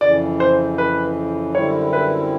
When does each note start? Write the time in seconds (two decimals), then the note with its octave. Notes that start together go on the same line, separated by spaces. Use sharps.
0.01 F2 C#3 E3 D5
0.40 C5
0.78 B4
1.54 F#2 D3 G3 C4 E4 C#5
1.93 B4